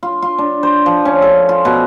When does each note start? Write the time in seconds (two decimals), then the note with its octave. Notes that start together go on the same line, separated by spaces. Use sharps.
0.03 F4
0.22 F4
0.38 D4
0.63 C5
0.86 F3
1.05 C#4
1.22 A4
1.49 F4
1.65 B2